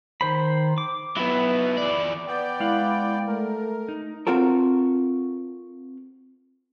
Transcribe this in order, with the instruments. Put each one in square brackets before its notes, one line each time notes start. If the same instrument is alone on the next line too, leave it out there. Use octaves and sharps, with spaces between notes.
[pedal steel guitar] D#3 C5 B5
D6
[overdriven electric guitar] F#3 B3 [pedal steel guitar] E4
[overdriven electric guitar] E3 D5
[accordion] B3 D5 G5
[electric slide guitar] G#3 F5 F#5 [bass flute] E4
[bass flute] A3 [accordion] A#4
[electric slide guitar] D#4
[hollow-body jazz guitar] C4 F4 F#4 A4 A#4